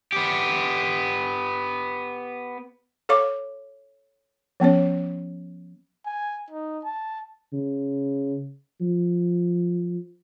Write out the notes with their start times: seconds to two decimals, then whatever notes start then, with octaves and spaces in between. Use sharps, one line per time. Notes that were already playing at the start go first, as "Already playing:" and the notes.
0.13 B3 G4
3.09 A4 C#5 F5 C#6 D6
4.60 F3 B3 C#4 C#5
6.06 G#5
6.51 D#4
6.85 A5
7.53 C#3
8.81 F3